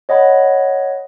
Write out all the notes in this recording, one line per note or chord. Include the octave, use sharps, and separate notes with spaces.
C#5 D#5 F#5 B5